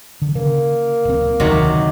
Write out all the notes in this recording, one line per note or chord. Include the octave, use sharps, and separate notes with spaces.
D3
C#3 A#3
D1 C4
E1 D2 C3 D#3 F#3